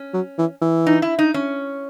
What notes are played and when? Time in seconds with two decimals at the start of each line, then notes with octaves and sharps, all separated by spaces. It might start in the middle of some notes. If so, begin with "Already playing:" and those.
Already playing: C#4
0.14 F#3
0.38 E3
0.62 E3
0.87 D#4
1.02 E4
1.19 D#4
1.34 C#4